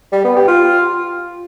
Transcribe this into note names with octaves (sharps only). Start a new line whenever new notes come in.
G3
B3
G4
F4